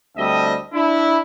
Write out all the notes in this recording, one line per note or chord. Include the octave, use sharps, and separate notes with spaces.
D2 G3 C4 D4 D#5 E5
D4 E4